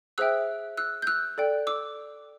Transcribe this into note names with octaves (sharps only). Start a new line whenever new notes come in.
G#4 C5 E5 G5 E6 F#6
E6 F#6
G6
E6 F#6
A4 D5 G5
D6 E6